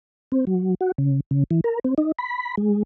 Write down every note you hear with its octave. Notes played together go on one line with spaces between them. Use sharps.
C4
F#3
F#4
C#3
C#3
E3
A#4
C4
D#4
B5
G#3